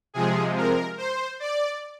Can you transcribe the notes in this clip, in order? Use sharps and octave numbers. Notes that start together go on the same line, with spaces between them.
C3 F3 G#3 G#4
A#4
C5
D5